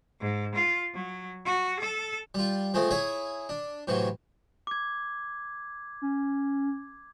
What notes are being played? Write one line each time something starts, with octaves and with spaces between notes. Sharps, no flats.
G#2
F4
F#3
F#4
A4
G3 F4
F3 G#3 A3 C4
E4 G#4 C#5 E5
D4
A2 C3 E3 F#3
D6 G#6
C#4